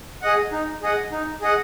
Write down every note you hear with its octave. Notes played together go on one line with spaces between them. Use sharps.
G#4 D#5 F#5
D#4
G#4 D#5 F#5
D#4
G#4 D#5 F#5